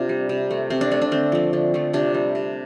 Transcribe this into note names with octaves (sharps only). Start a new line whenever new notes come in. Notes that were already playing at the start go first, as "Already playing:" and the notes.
Already playing: C3 D4 F4
G3
C3
A3
C3 C4
D4
A3 D4
D4
D3 C4
F3 A3
D3
F3 A3
C3 D4
G3
C3